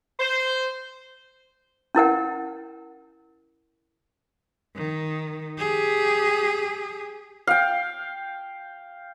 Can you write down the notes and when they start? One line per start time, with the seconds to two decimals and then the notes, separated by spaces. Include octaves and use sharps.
0.20 C5
1.95 C#4 E4 A#4 F#5
4.76 D#3
5.58 G4 G#4
7.47 F5 G5